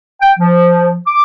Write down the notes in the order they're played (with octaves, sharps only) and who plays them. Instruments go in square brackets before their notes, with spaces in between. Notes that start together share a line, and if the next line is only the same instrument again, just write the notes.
[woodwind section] G5
F3
D6